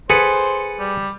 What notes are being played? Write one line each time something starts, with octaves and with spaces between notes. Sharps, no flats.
G#4 A4 B4 C5 F#5
G3